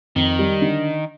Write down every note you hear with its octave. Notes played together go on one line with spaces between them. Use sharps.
F2 D#3
G3
D3